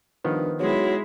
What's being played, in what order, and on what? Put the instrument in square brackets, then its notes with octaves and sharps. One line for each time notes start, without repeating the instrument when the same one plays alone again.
[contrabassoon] G2 [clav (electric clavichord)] D#3 F3 B3
[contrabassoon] B1 [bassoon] F#3 [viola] G#3 E4